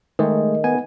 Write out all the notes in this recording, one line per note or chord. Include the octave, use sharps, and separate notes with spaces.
D#3 G#3 A3 G#4
B3 G#5